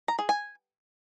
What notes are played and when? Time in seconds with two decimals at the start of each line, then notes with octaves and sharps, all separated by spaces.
0.08 A#5
0.19 G#4
0.29 G#5